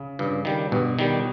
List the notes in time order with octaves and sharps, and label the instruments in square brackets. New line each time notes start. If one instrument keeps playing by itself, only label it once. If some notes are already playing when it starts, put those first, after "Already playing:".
Already playing: [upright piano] C#3
[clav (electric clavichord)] G2 [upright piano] C#3
[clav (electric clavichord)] D#3 G3
[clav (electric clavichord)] G2 [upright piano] B2
[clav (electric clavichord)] D#3 G3